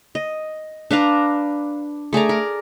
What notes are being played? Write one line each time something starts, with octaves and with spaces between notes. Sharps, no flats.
D#5
D4 B4 F5 A#5
A3 G#4 D5 A#5
A#4